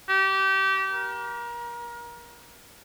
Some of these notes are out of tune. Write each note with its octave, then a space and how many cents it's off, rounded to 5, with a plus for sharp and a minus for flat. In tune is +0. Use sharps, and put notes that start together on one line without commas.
G4 -25
A#4 +30